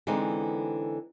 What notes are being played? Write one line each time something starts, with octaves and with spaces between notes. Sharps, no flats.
D3 E3 G#3 B3 C4 D#4